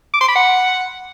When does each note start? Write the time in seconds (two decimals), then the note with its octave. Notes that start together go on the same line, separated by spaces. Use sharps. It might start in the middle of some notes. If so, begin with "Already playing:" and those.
0.13 D6
0.21 C6
0.28 B5
0.36 F#5